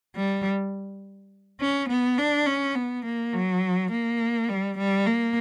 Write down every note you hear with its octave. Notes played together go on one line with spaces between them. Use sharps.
G3
C#4
B3
D4
C#4
B3
A#3
F#3
A#3
G3
G3
A#3